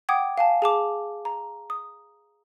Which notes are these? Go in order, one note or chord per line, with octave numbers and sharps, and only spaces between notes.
F#5 G5 D6 D#6 G#6
F5 G#5 A5
G#4 A5 D6
A#5
D#6